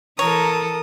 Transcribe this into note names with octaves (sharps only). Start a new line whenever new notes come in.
E3 A4 A#4 C#5 A#5 D#6